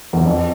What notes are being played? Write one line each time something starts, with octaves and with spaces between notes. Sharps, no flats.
E2
F2